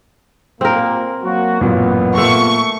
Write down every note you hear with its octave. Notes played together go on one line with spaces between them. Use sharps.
A#2 A#3 C4 A#4
F#3 A#3 F#4
A1 F#2 A#2 B3
A#2 A3 C#6 E6